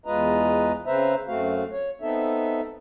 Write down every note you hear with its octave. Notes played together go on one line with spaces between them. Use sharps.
E2 G#3 F4 B4 D#5 A#5
C#3 C4 B4 C5 E5 A#5
F#2 A3 C4 F#4 F5
C#5
B3 C4 D#4 A4 E5